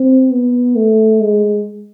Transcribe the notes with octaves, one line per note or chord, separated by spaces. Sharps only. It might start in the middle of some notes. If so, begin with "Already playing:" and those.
Already playing: C4
B3
A3
G#3